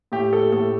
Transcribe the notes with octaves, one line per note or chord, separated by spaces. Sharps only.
A2 G4
A4
A2 A4